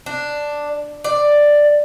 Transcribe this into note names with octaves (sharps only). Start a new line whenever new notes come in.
D4
D5